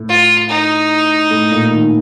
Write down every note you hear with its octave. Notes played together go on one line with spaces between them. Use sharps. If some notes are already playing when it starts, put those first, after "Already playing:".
Already playing: A2
F4
D#4
A2
A#2
D#3